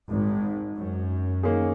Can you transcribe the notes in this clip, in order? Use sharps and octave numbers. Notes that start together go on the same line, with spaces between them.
G#1 G#2
F#2
D#3 A#3 C#4 G#4